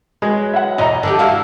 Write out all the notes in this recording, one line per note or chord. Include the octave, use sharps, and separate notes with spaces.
F#3 G#3 E4 B4
E5 F#5
E2 B2 D#5 A#5
D3 F3 D4 G4
E4 F#4 F5